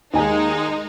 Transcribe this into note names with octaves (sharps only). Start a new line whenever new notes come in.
D#2 G#3 D#4 G#5